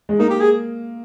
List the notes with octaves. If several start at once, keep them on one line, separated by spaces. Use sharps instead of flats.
G#3
A#3 D#4
G4
G#4